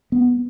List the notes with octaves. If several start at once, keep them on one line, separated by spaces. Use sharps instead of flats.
B3